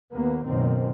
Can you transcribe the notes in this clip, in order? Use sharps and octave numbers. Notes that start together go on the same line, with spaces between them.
D#2 A#3 B3
F#1 B1 F#2 D#3 C4